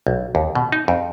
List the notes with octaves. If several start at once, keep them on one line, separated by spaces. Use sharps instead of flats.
B1
D#2
B2
D#4
F2